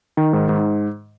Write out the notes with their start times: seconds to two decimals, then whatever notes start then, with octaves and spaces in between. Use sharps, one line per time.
0.17 D#3
0.33 G#2
0.49 G#2